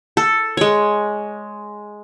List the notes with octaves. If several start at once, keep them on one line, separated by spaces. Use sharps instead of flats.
A4
G#3 C#5